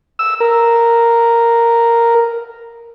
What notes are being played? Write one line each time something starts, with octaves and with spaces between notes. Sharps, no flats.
E6
A#4